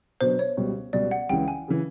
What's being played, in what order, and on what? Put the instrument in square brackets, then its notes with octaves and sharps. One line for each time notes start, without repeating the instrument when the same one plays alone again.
[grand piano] B2 F#3 B3 D4 [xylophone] C5
[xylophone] C#5
[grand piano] C#2 B2 G3
[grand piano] C#2 B2 G3 [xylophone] D5
[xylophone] F#5
[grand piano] C#2 C#3 E3 [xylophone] G5
[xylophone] G#5
[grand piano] C#3 E3